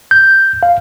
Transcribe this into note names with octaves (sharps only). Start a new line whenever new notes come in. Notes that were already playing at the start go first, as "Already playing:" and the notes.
G6
F5